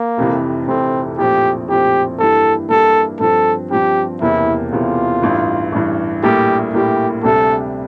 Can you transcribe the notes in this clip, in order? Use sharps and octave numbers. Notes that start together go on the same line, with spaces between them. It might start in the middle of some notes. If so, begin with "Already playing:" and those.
Already playing: A#3
F1 F2 C3 E3
F1 F2 C3 E3 C4
A#1 A2 F3 C4 G4
A#1 A2 F3 C4 G4
G2 E3 A#3 E4 G4 A4
G2 E3 A#3 E4 G4 A4
G2 F3 C4 A4
G2 F3 C4 G4
E1 E2 C3 E3 A#3 E4
E1 E2 C3 E3 A#3 F4
A1 G2 E3
A1 G2 E3
A#1 A2 G3 A#3 E4 G4
A#1 A2 G3 A#3 E4 G4
D2 C3 G3 D4 G4 A4